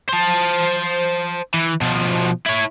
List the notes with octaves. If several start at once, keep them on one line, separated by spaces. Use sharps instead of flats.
C5 A5
E3
B2 F3
E4 C#5